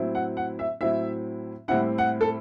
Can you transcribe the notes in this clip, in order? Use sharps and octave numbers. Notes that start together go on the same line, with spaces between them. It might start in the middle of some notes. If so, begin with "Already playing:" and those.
Already playing: A2 F#3 C4 E4
F#5
F#5
E5
A2 F#3 C4 E4 E5
A2 G3 C4 E4 F#5
F#5
A4